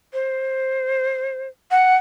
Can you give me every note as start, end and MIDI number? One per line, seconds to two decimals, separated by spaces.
0.13 1.48 72
1.71 1.95 78